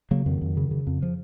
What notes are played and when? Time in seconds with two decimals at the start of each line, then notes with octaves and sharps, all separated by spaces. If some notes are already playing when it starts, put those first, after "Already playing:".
0.11 C#3 F#3 A#3
0.26 F2 D#3 F#3
0.41 F2
0.57 C#3
0.71 C#3
0.87 F2
1.02 F3